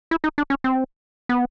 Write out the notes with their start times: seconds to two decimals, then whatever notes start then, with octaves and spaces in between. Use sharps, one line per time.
0.11 E4
0.24 D#4
0.38 D4
0.50 C#4
0.64 C4
1.29 B3